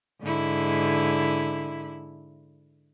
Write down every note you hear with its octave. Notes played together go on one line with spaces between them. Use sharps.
G#2 D3 E4